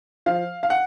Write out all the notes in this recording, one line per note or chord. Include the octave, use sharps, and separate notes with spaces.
F3 F5
F5
F#5